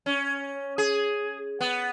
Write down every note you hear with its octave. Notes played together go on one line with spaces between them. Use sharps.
C#4
G#4
B3